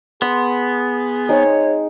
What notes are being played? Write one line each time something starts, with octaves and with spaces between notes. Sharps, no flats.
B3 G#4 C6
G#3 C4 D#4 C#5